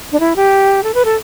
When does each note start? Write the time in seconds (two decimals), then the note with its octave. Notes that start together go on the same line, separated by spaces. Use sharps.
0.12 D4
0.20 E4
0.36 G4
0.84 A4
0.94 B4
1.05 A4